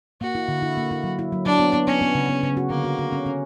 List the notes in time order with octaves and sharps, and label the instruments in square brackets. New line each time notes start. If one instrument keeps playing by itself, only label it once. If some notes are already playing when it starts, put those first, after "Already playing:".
[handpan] A#3 [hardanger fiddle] F#4
[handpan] E4
D3
E4
A#3
E4
F#3
E4
F#3
[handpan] F#3 [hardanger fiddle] D4
[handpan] B3
B3
[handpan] B3 [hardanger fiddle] C#4
[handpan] B3
C#3
B3
C#3
F#4
[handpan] D3 [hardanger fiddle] A#3
[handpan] F#4
F#4
C#4
C#4